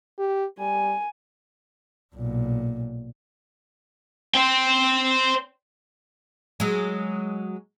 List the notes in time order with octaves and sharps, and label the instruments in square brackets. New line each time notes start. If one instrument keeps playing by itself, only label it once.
[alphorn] G4
[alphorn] G3 [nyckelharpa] G#5
[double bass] B1 A#2
[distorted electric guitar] C5 G5
[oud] F#3 G#3